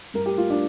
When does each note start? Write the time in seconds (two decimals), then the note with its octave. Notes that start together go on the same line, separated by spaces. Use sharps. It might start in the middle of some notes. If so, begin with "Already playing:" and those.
0.14 G2 A#4
0.26 G4
0.38 A#3 F4
0.50 D4